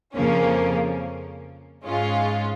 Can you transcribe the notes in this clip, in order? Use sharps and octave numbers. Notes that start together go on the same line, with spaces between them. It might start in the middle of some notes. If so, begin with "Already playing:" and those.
F2 C#3 F3 A#3 C#4
G#2 G#3 C#4 F4